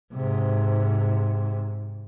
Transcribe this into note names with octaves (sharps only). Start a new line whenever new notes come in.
G#2 C3